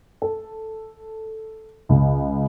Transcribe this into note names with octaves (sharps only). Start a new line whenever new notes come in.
A4
C#2